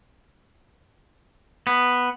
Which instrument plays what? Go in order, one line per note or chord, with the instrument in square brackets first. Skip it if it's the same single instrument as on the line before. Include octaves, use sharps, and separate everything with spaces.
[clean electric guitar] B3